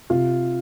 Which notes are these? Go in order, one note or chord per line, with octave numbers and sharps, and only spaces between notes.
C3 F4